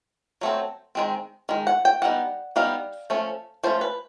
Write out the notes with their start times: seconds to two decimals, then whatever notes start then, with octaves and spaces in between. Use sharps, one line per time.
0.41 F#3 A3 C4
0.95 D#3 G#3 C4
1.49 D#3 G#3
1.67 F#5
1.85 G5
2.02 G3 B3 D#4 F#5
2.56 G3 B3 D#4 F5
3.10 F3 A3 C#4
3.64 F3 A3 C#4 C5
3.81 B4